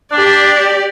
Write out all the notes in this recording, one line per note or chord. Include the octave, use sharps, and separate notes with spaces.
D4 G4 D5